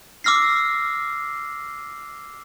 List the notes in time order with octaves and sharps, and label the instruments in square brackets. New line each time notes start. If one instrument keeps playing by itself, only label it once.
[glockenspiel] D6 E6 F6 A#6 C7